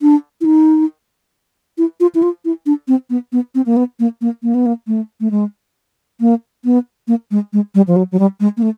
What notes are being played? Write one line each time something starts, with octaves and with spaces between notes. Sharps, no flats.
D4
E4
D#4
E4
F4
E4
F4
E4
D4
C4
B3
B3
C4
A#3
B3
A#3
A#3
A#3
B3
A#3
A3
A3
G#3
A#3
B3
A#3
G#3
G#3
G3
F3
F#3
F#3
G3
G#3
A#3
A3